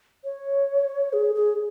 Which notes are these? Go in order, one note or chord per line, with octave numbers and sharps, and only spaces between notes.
C#5
G#4
G#4